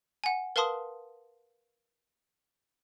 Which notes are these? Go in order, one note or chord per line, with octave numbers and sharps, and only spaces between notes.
F#5 G#5
A#4 B4 F5 A5 C6 D#6